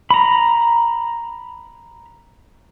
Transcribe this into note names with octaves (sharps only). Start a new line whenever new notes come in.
A#5 B5